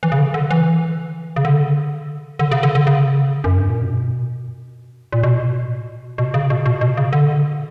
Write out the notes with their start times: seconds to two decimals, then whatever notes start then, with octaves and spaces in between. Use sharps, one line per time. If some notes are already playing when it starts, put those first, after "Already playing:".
0.03 E3
0.12 C#3
0.18 D3
0.34 D3
0.51 E3
1.36 C#3
1.45 D3
2.39 D3
2.52 C#3
2.63 D3
2.75 D3
2.87 C#3
3.44 F#2
3.57 G2
3.69 A#2
3.82 B2
5.13 A#2
5.23 B2
6.18 B2
6.34 C#3
6.50 B2
6.66 B2
6.81 B2
6.97 C#3
7.13 D3